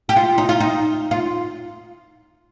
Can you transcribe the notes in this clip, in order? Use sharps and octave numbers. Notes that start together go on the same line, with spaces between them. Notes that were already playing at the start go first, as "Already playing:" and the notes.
G4
F4
D#4
F4
D#4
F4